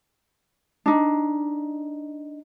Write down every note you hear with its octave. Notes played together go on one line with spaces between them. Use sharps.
D4 D#4